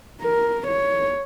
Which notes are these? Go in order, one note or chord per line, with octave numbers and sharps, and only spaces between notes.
A#4
C#5